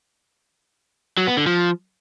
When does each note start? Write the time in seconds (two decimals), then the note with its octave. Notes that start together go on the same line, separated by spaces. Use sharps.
1.17 F#3
1.27 B3
1.37 D3
1.46 F3